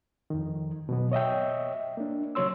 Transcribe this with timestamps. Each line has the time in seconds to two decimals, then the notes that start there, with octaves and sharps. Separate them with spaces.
0.30 F2 D#3
0.89 B2 F#3 B3
1.12 C#5 D#5 E5 G5
1.97 A#3 D4
2.35 C#3 F#3 C#5 C6 E6